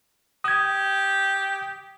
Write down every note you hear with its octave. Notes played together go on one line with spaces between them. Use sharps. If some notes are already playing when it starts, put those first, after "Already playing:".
G4 D#6 G#6